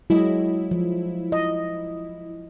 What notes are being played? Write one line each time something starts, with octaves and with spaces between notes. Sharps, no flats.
F#3 G#3 E4 D#5
F3
D#5